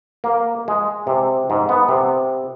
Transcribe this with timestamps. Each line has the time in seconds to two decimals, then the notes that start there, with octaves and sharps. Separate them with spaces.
0.24 A#3
0.68 G#3
1.07 C3
1.50 G#2
1.69 B3
1.89 C3